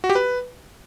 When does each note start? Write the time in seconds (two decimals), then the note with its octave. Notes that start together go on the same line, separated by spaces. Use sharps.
0.04 F#4
0.10 G4
0.15 B4